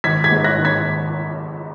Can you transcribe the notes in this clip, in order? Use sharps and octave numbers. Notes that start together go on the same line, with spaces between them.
G#1 G#6 B6
G#6 B6
G#2
F#6 A#6
D#3
G#6 B6